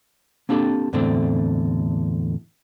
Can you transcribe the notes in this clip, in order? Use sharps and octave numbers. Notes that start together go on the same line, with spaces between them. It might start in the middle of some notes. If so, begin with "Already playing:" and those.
A#3 C4 D4 G4 A4
E2 A2 D3 A3 C4 D4